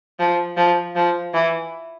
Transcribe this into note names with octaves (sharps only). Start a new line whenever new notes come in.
F3
F3
F3
E3